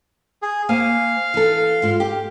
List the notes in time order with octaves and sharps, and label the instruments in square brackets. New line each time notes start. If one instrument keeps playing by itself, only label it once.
[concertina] G#4
[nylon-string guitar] A#3 C5 G#5 [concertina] F5
[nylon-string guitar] E3 A4
G#2 F4
G4